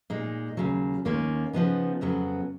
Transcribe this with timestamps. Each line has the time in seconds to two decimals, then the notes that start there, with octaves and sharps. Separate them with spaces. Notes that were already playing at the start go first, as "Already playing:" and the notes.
0.10 A#2 G#3 D#4
0.57 D#2 C#3 F#3
1.05 D#2 D#3 A#3 C#4
1.53 C#3 F3 B3 D#4
2.01 F2 C#3 F#3 B3